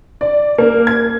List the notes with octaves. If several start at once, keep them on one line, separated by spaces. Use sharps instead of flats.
D5
A#3
G#6